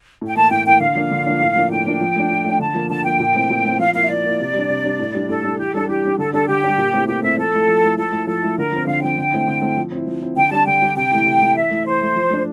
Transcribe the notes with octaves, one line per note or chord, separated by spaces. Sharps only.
A2
G5
E3 A#3 E4 A5
A2 G5
E3 A#3 E4 G5
D3 F5
F3 A#3 D4
D3
F3 A#3 D4
A2
F3 A#3 D4
A2 G5
F3 A#3 D4
F3
A3 D4
F3
A3 D4
D3 A5
F3 A#3
D3 A5
F3 A#3 G5
A#2
A3 C4 E4
A#2
A3 C4 E4
F3 F5
A#3 E4 F5
E5
F3 D5
A#3 E4
C3
G3 D4
C3
G3 D4
A2
G3 D4
A2 A4
G3 D4
E3 G4
G3 D4 A4
E3 G4
G3 D4
D3 A4
G3 D4 A4
D3 G4
G3 D4
A#2
A3 C4 E4
A#2 G4
A3 C4 E4 E5
F3 A4
A3 E4
F3
A3 E4
F3 A4
A3 E4
F3 A4
A3 E4
D3 A#4
F3 C4
D3 F5
F3 C4 G5
D3
A3 C4 E4
D3
A3 C4 E4
F3
C4
E4
F3
C4 E4
D3 G5
G3 D4 A5
D3 G5
G3 D4
C3 G5
E3 A3 E4
C3
E3 A3 E4
E3 E5
A3 E4
E3 C5
A3 E4
F3
A3 D4